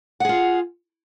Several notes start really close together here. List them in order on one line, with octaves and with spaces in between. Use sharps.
F#5 G#4 F4